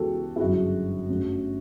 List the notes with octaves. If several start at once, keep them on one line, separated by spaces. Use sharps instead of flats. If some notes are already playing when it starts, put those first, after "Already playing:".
Already playing: C#2 C#3 E3 B3 F#4 G4 A4
E4
G1 F#2 C#3 F#4
G1 G2 F#3 A3 C#4